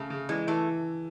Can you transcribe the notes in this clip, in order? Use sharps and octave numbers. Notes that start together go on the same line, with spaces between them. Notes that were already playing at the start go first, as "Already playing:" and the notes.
Already playing: C#3 A3
C#3
E3 G#3
E3 A3